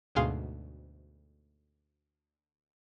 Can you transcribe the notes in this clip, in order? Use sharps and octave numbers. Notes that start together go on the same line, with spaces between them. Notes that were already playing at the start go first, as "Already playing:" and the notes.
D2 G#2 B2 G#4 F5 C6